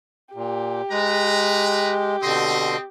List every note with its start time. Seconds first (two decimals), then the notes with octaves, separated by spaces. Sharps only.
0.35 A#2 G4
0.92 G#3 B4 A#5
2.23 B2 D3 C4 D#5 C6